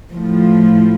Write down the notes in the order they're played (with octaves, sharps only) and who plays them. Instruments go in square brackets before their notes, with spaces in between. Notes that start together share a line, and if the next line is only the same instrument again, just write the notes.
[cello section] A2 F3